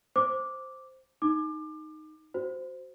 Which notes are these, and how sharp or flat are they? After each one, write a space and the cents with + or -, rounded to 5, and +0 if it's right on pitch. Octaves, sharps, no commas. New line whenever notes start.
C5 +0 D6 -5
D#4 +0 D6 +25
F#4 +0 C5 -10